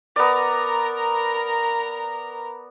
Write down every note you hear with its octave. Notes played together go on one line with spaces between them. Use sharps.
B3 A#4 D5 A#5